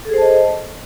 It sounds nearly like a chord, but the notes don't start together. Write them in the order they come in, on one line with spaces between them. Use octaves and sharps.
A4 G#4 C5 A5 D#5